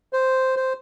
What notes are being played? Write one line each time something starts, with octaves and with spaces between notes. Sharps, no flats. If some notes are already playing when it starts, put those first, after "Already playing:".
C5
C5